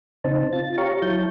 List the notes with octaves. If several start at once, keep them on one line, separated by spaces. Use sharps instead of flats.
C#3 C4 D#4 C5 A5
F4 A6
G4 C#5 F5 A#5 C#6
F#3 E4 C#5 A5 G6